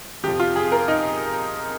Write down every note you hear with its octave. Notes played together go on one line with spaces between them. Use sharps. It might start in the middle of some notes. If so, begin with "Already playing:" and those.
F2 C3 F3 G4
F4
G#4
A#4
D#4